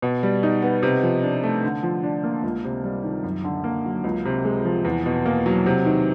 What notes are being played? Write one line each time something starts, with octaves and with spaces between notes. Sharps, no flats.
B2
G3
D#4
B3
C3
F3
D4
A3
D3
F3
D4
A#3
C#2
C3
G3
D#3
F#2
D3
A#3
F#3
C#2
C3
G#3
F3
E2
B2
A#3
F#3
C3
D#3